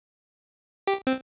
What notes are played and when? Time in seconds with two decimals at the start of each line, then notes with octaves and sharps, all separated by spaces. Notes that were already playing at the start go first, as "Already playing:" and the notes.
0.87 G4
1.07 C4